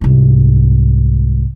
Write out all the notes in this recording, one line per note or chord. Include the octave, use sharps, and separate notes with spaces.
C2 G#2